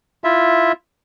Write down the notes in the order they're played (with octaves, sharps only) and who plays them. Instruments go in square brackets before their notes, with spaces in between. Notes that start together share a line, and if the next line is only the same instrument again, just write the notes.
[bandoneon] E4 F4 E5